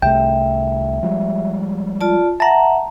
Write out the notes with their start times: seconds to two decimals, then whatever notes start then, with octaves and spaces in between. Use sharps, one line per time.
0.02 C2 C3 A3 E5 G5
1.03 F3 G3 G#3
2.01 F4 D5 A5
2.40 E5 F#5 A5 A#5